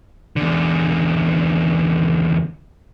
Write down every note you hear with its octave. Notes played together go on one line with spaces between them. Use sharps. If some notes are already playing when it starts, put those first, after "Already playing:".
E2 D3